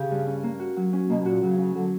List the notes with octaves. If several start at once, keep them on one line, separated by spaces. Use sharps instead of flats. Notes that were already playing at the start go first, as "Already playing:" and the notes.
Already playing: C#3 C#4 G4
G2
C#4
A#3
F#4
F#3
C#4
B2 A#3
B2
A#2 F#4
C#3 F#3
C#3 C#4
D3 F#3